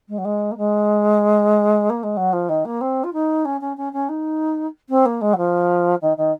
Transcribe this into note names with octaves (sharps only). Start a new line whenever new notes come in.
G#3
F#3
G#3
A#3
G#3
A#3
G#3
F#3
F3
D#3
A#3
C4
F4
D#4
C#4
C#4
C#4
C#4
D#4
C4
A#3
G#3
F#3
F3
D#3
D#3